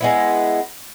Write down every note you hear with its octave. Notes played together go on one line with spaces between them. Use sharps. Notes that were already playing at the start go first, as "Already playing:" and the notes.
G#3 B3 E4